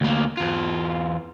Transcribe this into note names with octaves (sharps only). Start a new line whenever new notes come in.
D2 A#3
E2 F4